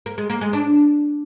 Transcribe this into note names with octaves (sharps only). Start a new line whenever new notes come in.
A#3
G#3
A#3
G#3
D4